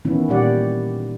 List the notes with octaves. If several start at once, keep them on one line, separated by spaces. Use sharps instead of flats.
D#3 E3 B3 C#4 E4
A#2 G3 B3 G4 D5 F#5